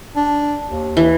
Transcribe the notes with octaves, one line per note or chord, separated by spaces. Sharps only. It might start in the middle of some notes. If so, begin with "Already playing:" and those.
D4
D#2
E3